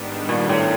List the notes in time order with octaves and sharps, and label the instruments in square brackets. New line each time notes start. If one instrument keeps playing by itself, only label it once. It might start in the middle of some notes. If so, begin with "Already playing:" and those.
Already playing: [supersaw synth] G#2 D#3 G3 B3 D4
[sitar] A#2
A2